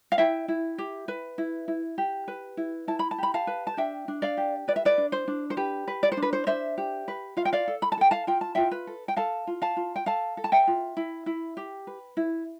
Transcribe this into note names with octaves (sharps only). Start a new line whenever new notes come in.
F5
E4 E5 G5
E4
G4
B4
E4
E4
G4
B4
E4
E4 A5
B5
A5
G4 B5
F5 A5
B4
A5
D4 E5 G5
D4
D5 F5
G4
B4 D5
E5
B4 D5
D4
C5
D4
C5
G4 B4
B4
D5
C5
D4
B4
C5
D4 C5 E5
G4
B4
F4 F5
G5
D5 F5
A4
B5
A5
A4 G5
F5 A5
F4 G5
A5
F4 E5 G5
B4
A4
G5
A4 F5 A5
F4
F5 A5
F4
G5
A4 F5 A5
A4
A5
E5 G5
F4
E4
E4
G4
B4
E4